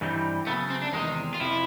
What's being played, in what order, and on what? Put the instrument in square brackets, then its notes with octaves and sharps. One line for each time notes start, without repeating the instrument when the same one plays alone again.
[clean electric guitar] G2 E3 G3 C4 D#4
[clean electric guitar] C#3 F#3 A3 [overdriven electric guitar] B3
[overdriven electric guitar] C4
D4
[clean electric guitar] E2 C3 D#3 G#3 [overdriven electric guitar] D#4
[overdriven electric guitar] F4
[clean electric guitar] F2 C3 F3 [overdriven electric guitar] E4